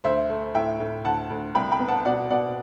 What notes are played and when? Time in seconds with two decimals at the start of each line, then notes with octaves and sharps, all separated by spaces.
0.04 D2 C5 E5
0.30 A3
0.54 A2 E5 G5
0.80 A2
1.04 D2 F#5 A5
1.30 D2
1.55 C2 G5 B5
1.72 G5 B5
1.80 B3
1.88 F#5 A5
2.05 B2 D5 F#5
2.30 B2 D5 F#5